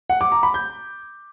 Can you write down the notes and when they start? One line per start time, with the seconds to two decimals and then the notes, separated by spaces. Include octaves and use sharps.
0.10 F#5
0.21 D6
0.32 A#5
0.43 B5
0.54 G6